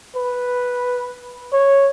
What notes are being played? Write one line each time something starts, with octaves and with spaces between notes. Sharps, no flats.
B4
C#5